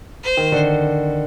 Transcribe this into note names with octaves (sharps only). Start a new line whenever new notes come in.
C5
D#3
D3